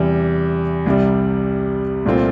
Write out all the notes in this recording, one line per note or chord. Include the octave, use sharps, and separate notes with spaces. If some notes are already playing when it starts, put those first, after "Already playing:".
Already playing: E2 C3 G3
C2 C3 G3
C2 A#2 A3 C4 F4